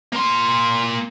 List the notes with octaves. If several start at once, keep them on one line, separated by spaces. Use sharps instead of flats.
A#3 C6